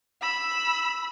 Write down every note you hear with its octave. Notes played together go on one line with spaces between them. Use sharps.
B5 E6